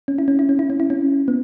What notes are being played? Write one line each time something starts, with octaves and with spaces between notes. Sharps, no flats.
C#4
E4
C#4
E4
C#4
E4
C#4
E4
C#4
B3